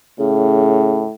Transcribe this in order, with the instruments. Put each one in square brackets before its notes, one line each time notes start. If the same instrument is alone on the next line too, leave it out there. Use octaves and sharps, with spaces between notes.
[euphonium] A2 [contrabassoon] C#3